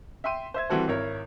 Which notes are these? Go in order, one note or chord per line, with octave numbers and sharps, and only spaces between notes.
E5 G5 C6 D#7
C5 E5 G#6
E3 G3 C4 F#4 A4 C5
G#1 E4 A#4 C#5